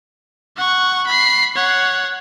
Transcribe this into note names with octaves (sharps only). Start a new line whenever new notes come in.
F#5 C#6
B5 C7
C#5 F#5